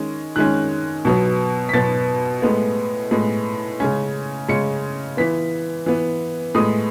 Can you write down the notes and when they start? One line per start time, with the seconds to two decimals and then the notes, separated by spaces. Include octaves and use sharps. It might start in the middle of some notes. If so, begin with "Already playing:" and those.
Already playing: D#3 G#3 C#4
0.36 D#3 G#3 C#4 F#6
1.05 B2 F#3 B3
1.69 B6
1.74 B2 F#3 B3 A6
2.42 A2 G#3 B3
3.11 A2 G#3 B3
3.80 C#3 G#3 C#4
4.48 C#3 G#3 C#4 C#7
5.17 E3 B3 B6
5.86 E3 B3
6.55 A2 G#3 B3 D#6